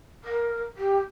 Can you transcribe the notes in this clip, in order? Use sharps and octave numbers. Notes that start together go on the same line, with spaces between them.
A#4
G4